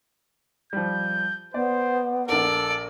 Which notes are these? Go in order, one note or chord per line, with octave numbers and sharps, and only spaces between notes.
F3 G3 G6
B3 C5 D5
A#1 A#3 A4 D5